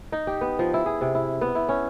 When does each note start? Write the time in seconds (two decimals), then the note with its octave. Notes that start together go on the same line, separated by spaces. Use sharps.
0.12 D#4
0.27 G4
0.41 B3
0.59 F3
0.74 E4
0.86 G#4
1.01 C3
1.15 E4
1.41 B3
1.55 E4
1.69 C#4